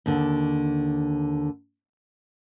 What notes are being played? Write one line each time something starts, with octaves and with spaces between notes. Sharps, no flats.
D#2 D3